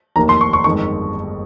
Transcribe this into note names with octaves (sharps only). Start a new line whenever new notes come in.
F1 D#2 D#3 A#3 A#5
C6
C#6
C#6
G1 F2 D#3 G#3 C#6